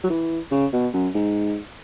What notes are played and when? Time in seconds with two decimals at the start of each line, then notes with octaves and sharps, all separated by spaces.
0.04 F#3
0.10 E3
0.51 C#3
0.73 B2
0.94 F#2
1.15 G#2